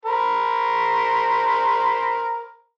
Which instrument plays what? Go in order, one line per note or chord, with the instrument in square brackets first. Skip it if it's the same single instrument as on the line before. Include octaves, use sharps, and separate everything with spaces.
[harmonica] A#4 C5 B5